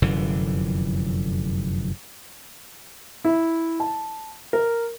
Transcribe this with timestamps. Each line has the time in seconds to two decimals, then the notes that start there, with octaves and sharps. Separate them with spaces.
0.02 F1 F#2 D3 E3
3.25 E4
3.80 A5
4.53 A#4